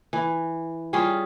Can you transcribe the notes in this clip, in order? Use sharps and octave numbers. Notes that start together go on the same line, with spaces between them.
E3
G3 C#4 F4 G#4